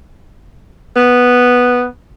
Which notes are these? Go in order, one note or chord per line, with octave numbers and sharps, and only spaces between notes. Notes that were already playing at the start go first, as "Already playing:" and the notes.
B3